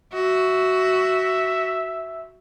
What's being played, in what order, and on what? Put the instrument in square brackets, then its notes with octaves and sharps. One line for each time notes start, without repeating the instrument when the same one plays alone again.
[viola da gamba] F#4 [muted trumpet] E5